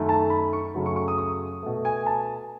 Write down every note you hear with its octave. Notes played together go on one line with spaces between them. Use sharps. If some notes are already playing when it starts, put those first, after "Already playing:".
Already playing: F#2 D#3 A3
A5
B5
C#6
F#2 C#3 F#3 A3
C#6
C#6
D#6
D#6
B2 A3
G#5
A5